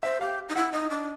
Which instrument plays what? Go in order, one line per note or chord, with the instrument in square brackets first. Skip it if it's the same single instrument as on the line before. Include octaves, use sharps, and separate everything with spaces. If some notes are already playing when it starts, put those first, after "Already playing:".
[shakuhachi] C5 [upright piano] E5
[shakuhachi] G4 [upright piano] F5
[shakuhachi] D#4
[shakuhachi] E4 [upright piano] F#5
[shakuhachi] D#4 [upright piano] D#5
[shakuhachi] D4